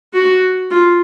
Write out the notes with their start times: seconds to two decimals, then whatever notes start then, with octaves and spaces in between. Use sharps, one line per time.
0.14 F#4
0.70 F4